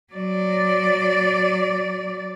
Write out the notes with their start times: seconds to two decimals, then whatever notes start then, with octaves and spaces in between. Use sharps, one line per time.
0.13 F#3 D5